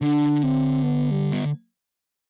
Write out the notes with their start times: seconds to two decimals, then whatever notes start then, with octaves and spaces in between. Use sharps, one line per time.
0.01 D3 D4
0.43 C4
0.83 B3
1.11 G3
1.33 B3